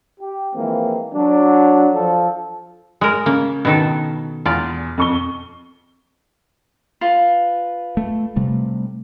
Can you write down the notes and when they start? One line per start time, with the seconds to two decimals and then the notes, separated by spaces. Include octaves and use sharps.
0.20 G4
0.54 E3 F3 G#3 A#3 C4
1.14 F#3 D4
1.95 F3 A4
3.01 G#3 A#4
3.26 C#3 A#3
3.65 B2 D#3 A4
4.46 E2 F4 D5
4.98 F2 C#6 G7
7.01 F4 B4
7.97 A3
8.36 C3 G3 A3